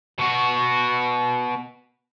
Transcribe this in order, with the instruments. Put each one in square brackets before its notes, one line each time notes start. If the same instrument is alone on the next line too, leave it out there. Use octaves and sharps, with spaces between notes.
[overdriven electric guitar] B2 F#4